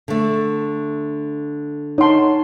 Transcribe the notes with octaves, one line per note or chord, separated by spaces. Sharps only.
D3 A3
D#4 C#5 F#5 A5 C6